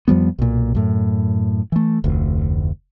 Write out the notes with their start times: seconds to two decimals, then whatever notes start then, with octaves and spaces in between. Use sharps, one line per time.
0.08 F2 F3 G3 B3
0.39 B1 A#2
0.75 F#2 A2
1.72 E3 A3
2.04 F1 D2